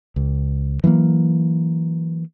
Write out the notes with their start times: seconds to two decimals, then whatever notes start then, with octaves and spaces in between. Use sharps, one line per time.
0.16 C#2
0.84 E3 F#3 G#3 A#3